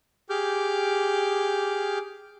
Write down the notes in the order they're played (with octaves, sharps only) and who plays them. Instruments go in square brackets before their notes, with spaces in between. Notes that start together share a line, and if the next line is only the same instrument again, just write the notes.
[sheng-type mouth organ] G4 G#4 D6 F6 G6